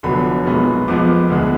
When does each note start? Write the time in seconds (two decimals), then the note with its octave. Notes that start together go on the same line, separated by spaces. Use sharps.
0.03 F1 F2 D3 F#3 B3 B5
0.46 B1 A#2 G#3 B3
0.88 F2 F3 G#3 B3 D6
1.30 D2 D3 G#3 B3